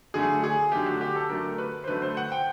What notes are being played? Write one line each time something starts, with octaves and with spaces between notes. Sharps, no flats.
D3 F#3 A3 G#4
G#4
D3 F#3 A3 G4
F#4
G4
A4
D3 F#3 A3 A#4
B4
C5
D3 F#3 A3 B4
C5
F#5
G5